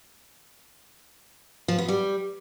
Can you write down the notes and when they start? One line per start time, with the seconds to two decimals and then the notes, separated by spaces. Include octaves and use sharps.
1.68 F3
1.78 B3
1.88 G3